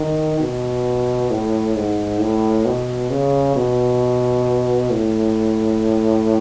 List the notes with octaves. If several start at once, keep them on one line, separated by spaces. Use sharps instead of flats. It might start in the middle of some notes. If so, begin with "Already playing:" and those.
Already playing: D#3
B2
A2
G#2
A2
B2
C#3
B2
A2